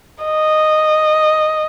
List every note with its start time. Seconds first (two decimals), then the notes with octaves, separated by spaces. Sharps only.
0.24 D#5